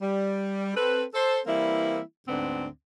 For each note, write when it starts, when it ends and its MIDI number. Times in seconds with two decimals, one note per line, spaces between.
0.02 0.72 55
0.75 1.04 60
0.75 1.04 69
0.75 1.04 71
1.14 1.39 69
1.14 1.39 72
1.47 2.00 52
1.47 2.00 55
1.47 2.00 58
1.47 2.00 60
1.47 2.00 64
2.28 2.67 38
2.28 2.67 44
2.28 2.67 50
2.28 2.67 59
2.28 2.67 60
2.28 2.67 62